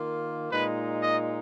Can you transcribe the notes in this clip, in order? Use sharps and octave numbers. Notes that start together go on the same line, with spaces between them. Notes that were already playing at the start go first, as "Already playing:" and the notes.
Already playing: D#3 A#3 F4
A#2 G#3 D#4 B4
D#5